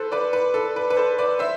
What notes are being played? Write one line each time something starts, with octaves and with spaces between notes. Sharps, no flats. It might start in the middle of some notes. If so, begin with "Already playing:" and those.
Already playing: A4 B4 C5
B4 D5
B4
A4
B4
B4
A4 C5
B4 D5
C5 E5